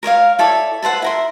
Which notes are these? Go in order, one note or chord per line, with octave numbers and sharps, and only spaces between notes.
A#4 C#5 D5 F5
E4 A4 C#5 D5
A4 B4 C5 F#5
E4 A#4 C6